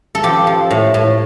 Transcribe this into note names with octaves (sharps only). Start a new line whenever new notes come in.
A4
F3 G4
F3
A2
A2